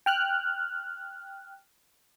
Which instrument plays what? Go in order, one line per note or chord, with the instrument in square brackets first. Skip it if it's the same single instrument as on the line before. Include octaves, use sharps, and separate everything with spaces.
[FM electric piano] G5 F6 F#6